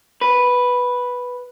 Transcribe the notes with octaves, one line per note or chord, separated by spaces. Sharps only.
B4